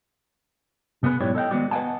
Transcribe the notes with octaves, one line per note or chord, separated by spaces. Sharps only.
C3 B3 G#4 B4
B1 G#2 E4 G4 C#5 D5
A4 D#5 F#5 G5
D#3 G#3 B3 C4 F#4 D5
B4 D#5 F5 F#5 G#5 A5